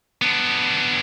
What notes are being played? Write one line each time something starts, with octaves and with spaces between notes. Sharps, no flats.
B3 D4